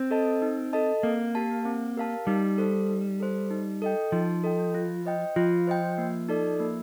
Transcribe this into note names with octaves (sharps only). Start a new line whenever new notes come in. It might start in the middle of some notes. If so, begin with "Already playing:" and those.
Already playing: C4
A4 D#5 A5
D#4
A4 D#5 A5
A#3 C4
G4 A#4 F5 A5
C4
G4 A#4 F5 A5
G3 D#4
A4 C5
D#4
A4 C5
D#4
A4 D#5 G5
F3 D#4
A4 D#5 G5
F4
C5 D#5 G5
F3 F4
C5 D#5 G5
A#3
D#4 A4 D5
A#3